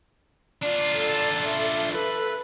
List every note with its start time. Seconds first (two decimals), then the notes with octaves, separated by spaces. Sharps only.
0.63 D4 F4 D5
0.97 A4
1.44 E5
1.93 A4 B4